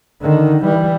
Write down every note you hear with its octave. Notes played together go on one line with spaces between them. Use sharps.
D3 D#3
E3 G3